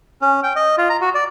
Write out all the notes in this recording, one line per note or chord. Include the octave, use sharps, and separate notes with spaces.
C#4
G5
D#5
F4
A#5
F#4
D5